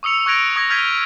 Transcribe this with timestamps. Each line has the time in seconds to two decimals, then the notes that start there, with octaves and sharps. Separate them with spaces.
0.03 C#6 D#6 E6 C#7 F7
0.26 C#6 F#6 G#6 A#6 D7 F7
0.56 C#6 D#6 G#6 A#6
0.70 F6 G6 G#6 B6 D#7